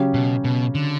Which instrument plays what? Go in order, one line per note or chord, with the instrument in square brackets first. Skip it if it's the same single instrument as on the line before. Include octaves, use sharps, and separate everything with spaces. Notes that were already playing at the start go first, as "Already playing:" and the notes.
Already playing: [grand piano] C#3 F#3 C#4 G4
[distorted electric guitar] B2
B2
D3